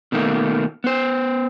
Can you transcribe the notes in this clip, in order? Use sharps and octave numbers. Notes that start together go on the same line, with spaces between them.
B2 D#3 A3 A#3
B3 C5